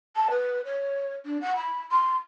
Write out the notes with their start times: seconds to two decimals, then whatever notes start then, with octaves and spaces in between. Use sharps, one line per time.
0.16 A5
0.31 B4
0.65 C#5
1.25 D4
1.41 F#5
1.56 B5
1.92 C6